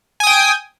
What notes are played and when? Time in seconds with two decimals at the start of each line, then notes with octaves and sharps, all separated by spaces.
0.20 G#5
0.23 D#6
0.27 G5